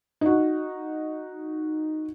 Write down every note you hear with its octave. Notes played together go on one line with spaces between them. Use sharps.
D#4 F#4